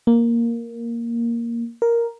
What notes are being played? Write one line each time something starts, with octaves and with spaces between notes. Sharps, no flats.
A#3
A#4